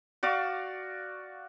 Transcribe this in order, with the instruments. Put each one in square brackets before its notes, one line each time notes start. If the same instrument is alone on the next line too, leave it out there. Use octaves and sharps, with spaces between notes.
[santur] F#4 D5 F5 C#6